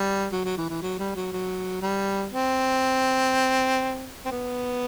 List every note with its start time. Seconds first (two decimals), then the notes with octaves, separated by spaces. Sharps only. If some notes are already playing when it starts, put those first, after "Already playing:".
Already playing: G3
0.32 F#3
0.44 F#3
0.57 E3
0.69 E3
0.82 F#3
0.99 G3
1.15 F#3
1.32 F#3
1.82 G3
2.32 C4
4.25 C4
4.31 B3